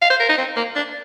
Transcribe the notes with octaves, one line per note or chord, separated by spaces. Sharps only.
F5
C5
A#4
D#4
C4
A#3
D4